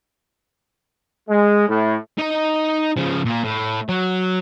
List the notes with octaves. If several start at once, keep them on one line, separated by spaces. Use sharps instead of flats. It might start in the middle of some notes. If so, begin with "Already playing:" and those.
G#3
A2
D#4 D#5
C#3 F3
A#2 A#3
A2
F#3